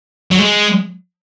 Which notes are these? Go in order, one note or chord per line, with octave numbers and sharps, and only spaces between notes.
F#3
G#3